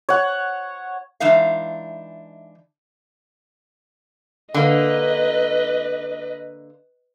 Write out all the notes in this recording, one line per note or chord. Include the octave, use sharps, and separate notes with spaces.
C#5 F#5
E3 G#3 D4 D#4 E5 F5
D3 A#3 B4 D#5